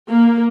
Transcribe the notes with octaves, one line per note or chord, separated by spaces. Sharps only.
A#3